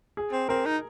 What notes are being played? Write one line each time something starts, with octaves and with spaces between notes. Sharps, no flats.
G#4
C4
C4 A#4
D#4